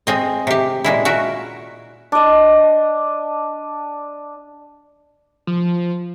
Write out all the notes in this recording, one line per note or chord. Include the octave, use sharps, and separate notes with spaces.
G#3 C4 D#5
C3 G4
A#2 G#3 E4
F#4 A#4 E5
D4 D#5
F3